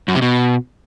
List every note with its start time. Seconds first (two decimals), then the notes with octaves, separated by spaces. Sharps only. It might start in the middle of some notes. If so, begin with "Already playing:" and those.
0.08 F#2
0.15 C3
0.22 B2